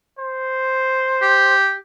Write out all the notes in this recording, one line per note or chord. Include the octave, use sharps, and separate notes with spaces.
C5
G4